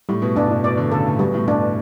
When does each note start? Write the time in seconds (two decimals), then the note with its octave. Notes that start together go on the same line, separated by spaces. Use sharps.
0.09 A2 G3
0.22 B2
0.36 G2 D4
0.49 A2
0.64 B2 D5
0.77 D3
0.91 C#3 A4
1.06 A2
1.19 B2 G3
1.34 A2
1.47 G2 D4